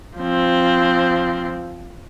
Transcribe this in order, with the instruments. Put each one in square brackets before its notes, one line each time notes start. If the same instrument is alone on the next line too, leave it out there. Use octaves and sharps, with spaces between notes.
[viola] F3 C4